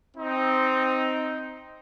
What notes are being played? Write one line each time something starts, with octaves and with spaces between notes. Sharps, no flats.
C4 D#4